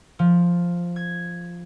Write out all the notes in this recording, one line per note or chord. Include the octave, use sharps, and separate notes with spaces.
F3
G#6